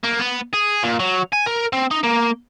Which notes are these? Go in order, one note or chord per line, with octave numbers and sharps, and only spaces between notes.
A#3
B3
G#4
A#2
F#3
G#5
A#4
C4
D#4
A#3